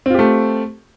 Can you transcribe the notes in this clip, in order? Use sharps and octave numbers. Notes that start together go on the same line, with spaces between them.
A3 C4 F4 G4